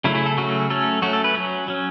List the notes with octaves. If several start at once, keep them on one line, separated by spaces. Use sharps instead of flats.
C#3 F#3 A3 C#4 E4
E4
A4
C#3 F#3 A3 C#4 F#4
F#3 A3 C#4 A4
F#3 A3 C#4 F#4
A4
B4
F#3 C#4
F#3 C#4